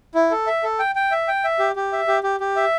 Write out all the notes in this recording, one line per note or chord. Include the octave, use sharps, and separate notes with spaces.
E4
A4
E5
A4
G5
G5
E5
G5
E5
G4
G4
E5
G4
G4
G4
E5